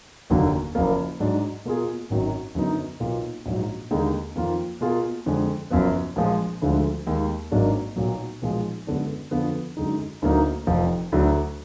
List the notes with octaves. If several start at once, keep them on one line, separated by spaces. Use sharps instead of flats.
F1 D#2 D3 F#3 A#3
F#1 F#2 F3 A#3
G#2 F#3 D4
B2 A#3 F4 G#4
G#1 F#2 D#3 F#3
F#2 D3 F#3 B3 D#4
B1 B2 A#3 F4
A#1 G#2 F#3
D#2 D3 G#3 D#4 G#4
F2 D#3 A#3 F4
B2 A#3 F4 G#4
F2 D3 G#3
F#1 F#2 F3 B3
A#1 A#2 F3 G#3
D2 D3 F3 G#3
D#2 D#3 G#3
G#1 G#2 F#3 A#3 D4
B1 A#2 F#3
B1 A#2 F3 G#3
F#2 D3 G#3 B3 D4
F2 D3 F3 B3
F#2 D3 G#3 D#4
D2 D3 F#3 A#3 D#4
F1 F2 F3
D2 D3 F#3